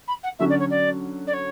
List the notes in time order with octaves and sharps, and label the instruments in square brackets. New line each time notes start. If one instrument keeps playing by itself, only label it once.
[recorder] B5
F#5
[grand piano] D3 F#3 C#4 F#4 [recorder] E5
[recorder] D5
C#5
D5
D5
C#5